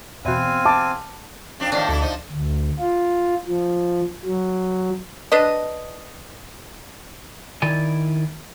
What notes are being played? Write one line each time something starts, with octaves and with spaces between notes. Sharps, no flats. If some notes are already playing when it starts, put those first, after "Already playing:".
E2 B2 C4 F5 G#5
A5 D6
F2 D4 D5
A2 D#3 F3 D4
D2 B2 E4 A4
F3 D#4
D2
F4
F3
F#3
D4 B4 D#5
D#3 E4 D5 G#5